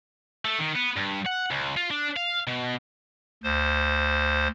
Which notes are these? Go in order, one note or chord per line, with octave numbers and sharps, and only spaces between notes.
A3
D#3
B3
G2
F#5
C#2
F4
D4
F5
B2
D2 C5